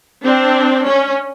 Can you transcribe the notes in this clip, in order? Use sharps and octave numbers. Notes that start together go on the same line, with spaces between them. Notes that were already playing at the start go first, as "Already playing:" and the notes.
C4 D4
C#4